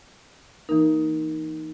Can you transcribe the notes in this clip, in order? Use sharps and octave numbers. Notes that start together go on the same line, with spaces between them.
E3 A#3 D#4 A#4